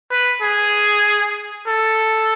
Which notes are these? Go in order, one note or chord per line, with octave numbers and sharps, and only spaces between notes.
B4
G#4
A4